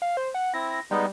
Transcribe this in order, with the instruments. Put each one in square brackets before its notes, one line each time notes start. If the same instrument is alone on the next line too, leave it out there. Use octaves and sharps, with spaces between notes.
[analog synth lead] F5
C5
F#5
[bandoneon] C4 E4 [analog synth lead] A#6
[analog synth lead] G3 [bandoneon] G#3 B3 D#4